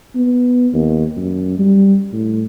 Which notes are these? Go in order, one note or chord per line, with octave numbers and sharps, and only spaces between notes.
B3
D#2
F#2
G3
A2